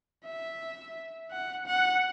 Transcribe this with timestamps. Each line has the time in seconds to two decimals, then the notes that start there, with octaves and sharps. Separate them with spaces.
0.24 E5
1.31 F#5
1.67 F#5